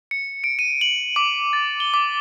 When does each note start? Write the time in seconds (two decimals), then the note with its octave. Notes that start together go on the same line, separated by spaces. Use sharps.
0.11 C#7
0.44 D7
0.59 D#7
0.81 F#7
1.16 D6
1.53 A6
1.80 G7
1.94 D6